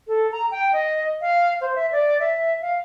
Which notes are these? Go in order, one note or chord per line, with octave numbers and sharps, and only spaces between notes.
A4
A#5
G5
D#5
F5
C5
E5
D5
E5
F5